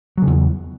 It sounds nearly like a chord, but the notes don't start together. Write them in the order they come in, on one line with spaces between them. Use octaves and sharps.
F#3 C#3 E2